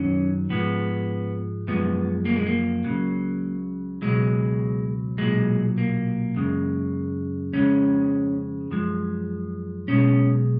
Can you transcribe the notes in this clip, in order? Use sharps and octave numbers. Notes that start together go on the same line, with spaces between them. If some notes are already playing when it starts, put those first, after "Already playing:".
Already playing: F#2 D#3 F#3 C#4
G#2 F3 G#3 B3
F#2 F3 G#3 B3
A#3
G#3
A#3
C#2 C#3 F#3
C#2 B2 F#3 G#3
B1 A#2 F#3 G#3
A#3
F#2 C#3 G#3
F2 C#3 G#3 C#4
F#2 F3 G#3
B1 B2 G#3 C#4